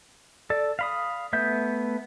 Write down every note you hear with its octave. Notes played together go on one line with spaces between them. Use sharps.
A4 D5
F5 B5 D#6
A3 B3 E5 G6